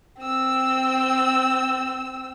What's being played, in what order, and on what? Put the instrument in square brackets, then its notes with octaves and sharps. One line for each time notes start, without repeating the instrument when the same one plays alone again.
[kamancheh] C4 E6